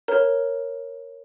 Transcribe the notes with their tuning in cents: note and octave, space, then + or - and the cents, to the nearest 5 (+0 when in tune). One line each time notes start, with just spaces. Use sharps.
A#4 +0 C#5 -10 A#5 +0